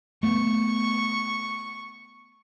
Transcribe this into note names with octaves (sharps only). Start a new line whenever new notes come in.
A3 B3 C#6